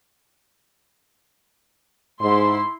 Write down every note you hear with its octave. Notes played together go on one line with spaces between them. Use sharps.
G#2 E4 C6